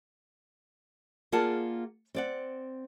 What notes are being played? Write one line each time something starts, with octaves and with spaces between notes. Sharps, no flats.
A#3 F4 G#4 D5 F#5 A5
C4 D5 F#5